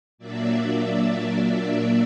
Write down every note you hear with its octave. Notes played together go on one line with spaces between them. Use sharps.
A#2 F#3 A#3 D4 D5 E5